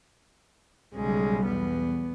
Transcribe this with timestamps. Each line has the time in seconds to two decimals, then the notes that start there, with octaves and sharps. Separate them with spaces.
0.95 B1 C#3 G3 G#3
1.46 E2 B3